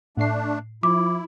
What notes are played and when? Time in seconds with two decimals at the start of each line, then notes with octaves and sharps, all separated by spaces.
0.17 A2 A3 D4 C7
0.83 F3 E4 D6